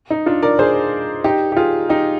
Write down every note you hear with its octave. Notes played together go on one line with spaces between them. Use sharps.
D#4
D4 F4
A#4 D5
G#4 C5
D#4 G4
G4
F4 G#4
D#4 G4